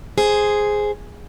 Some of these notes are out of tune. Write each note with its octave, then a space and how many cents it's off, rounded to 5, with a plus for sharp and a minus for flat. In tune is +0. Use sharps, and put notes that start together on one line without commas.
G#4 +0 C5 +0